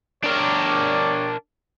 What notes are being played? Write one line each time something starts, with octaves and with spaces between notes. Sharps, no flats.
D4 G4 A#4 C#5 D5